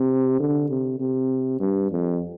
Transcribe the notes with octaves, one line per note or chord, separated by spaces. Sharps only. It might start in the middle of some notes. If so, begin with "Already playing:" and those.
Already playing: C3
D3
C3
C3
G2
F2